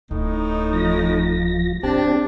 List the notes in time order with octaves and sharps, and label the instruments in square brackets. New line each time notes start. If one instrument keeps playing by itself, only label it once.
[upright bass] D1 [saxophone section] A2 D#4
[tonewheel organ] F3 A#6
[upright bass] G#2 [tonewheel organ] C4 G4 A5 [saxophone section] D4